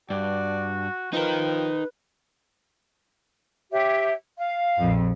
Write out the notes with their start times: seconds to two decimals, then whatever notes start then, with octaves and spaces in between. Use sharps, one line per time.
0.10 G2 F#4 D5
1.13 F3 D#4 A#4 B4 G5
3.71 G4 C#5 E5
4.37 F5
4.78 A#1 F2